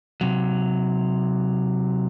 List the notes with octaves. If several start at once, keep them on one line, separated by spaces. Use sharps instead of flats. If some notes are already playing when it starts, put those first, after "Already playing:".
C3 F#3